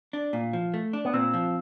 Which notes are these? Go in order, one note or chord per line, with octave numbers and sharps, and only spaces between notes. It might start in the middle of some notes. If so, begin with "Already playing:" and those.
D4
A#2
F3
A3
D4
B3
A#2 C4
F3